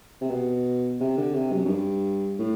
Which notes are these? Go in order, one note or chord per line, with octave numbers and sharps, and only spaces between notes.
C3
B2
C3
D3
C3
F#2
F#2
G2
A2